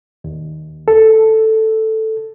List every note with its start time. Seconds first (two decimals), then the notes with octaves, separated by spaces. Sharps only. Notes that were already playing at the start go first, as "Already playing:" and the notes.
0.24 D#2
0.88 A4